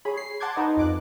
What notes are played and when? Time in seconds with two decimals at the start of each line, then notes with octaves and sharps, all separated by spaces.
0.05 G#4 C#5 B5
0.17 C7
0.40 F#5 A5 C6 D6 G6 G#6
0.57 D#4 B4 D#5
0.77 F2 D6 F#6